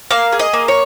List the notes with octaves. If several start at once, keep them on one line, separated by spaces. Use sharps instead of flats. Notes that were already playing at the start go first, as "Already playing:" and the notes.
A#3 F5
G#4
D#5
A#3
C#5